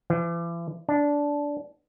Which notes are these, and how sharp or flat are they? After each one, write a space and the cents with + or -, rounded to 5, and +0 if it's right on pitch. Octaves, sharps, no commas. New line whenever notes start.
E3 +40
D4 -15